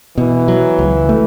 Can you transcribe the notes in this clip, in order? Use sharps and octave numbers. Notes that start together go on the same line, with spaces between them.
B2 E3
F#3
C#2
A3